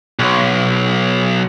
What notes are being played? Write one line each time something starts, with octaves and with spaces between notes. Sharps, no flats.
B1